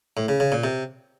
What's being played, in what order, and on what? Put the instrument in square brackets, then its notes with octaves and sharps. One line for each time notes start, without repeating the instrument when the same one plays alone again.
[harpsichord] A2
C#3
C#3
A#2
C3